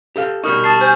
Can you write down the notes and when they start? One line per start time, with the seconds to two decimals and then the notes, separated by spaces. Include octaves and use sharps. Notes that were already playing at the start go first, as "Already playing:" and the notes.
0.16 G4 A4 F5
0.44 B2 G3 D#4 A#4 C#6 D#6 F6
0.64 A5 D#6 A6 C7
0.80 C5 G#5 C#6 G6